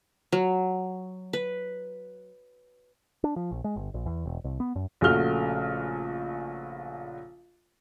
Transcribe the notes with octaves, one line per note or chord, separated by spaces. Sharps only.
F#3
B4
D4
F3
A#1
G#3
G1
A#1
E2
E1
C2
B3
F#2
A#1 C#3 A3 F#4 F6 G7